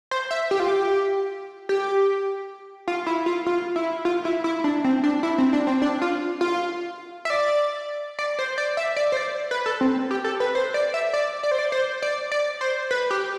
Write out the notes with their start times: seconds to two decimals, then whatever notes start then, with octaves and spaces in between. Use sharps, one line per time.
0.11 C5
0.31 E5
0.51 G4
0.60 F4
0.68 G4
1.69 G4
2.88 F4
3.07 E4
3.26 F4
3.46 F4
3.76 E4
4.05 F4
4.25 E4
4.44 E4
4.64 D4
4.84 C4
5.04 D4
5.23 E4
5.38 C4
5.53 D4
5.67 C4
5.82 D4
6.02 F4
6.41 F4
7.25 E5
7.30 D5
8.19 D5
8.39 C5
8.58 D5
8.77 E5
8.96 D5
9.12 C5
9.17 D5
9.51 B4
9.66 A4
9.81 C4
10.11 G4
10.24 A4
10.40 B4
10.55 C5
10.74 D5
10.94 E5
11.13 D5
11.43 D5
11.51 C5
11.59 D5
11.72 C5
12.02 D5
12.32 D5
12.61 C5
12.91 B4
13.11 G4